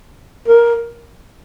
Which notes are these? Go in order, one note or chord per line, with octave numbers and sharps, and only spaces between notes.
A#4